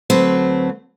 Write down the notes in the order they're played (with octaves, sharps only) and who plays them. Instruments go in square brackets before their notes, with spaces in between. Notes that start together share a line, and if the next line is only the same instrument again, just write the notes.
[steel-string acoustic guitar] D2 F#3 A3 C4 B4